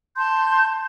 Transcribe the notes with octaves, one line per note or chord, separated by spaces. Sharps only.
A5 C6 G6